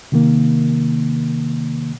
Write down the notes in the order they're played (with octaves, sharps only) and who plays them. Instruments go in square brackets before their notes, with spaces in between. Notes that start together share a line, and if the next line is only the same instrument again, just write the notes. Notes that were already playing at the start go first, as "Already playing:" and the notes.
[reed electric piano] C3 D#3 A#3